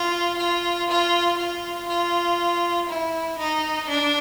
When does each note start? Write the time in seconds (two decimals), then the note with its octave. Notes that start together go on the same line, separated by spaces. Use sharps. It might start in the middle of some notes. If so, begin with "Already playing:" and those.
Already playing: F4
0.39 F4
0.90 F4
1.39 F4
1.89 F4
2.89 E4
3.39 D#4
3.89 D4